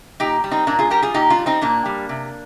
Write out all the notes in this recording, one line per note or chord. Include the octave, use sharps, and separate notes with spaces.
A#2 D#4 G4
G3
C4 D#4
A#2 A#3 D4
F4 G#4
G3 G4 A#4
F4 G#4
A#2 D#4 G4
D4 F4
G3
C4 D#4
A#2 A#3 D4
G3
C3